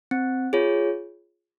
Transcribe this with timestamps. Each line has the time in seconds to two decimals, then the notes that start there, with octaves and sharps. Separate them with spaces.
0.11 C4
0.53 F4 G#4 C#5